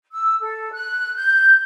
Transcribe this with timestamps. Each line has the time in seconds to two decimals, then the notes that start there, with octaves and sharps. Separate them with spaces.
0.13 E6
0.41 A4
0.73 F#6
1.15 G6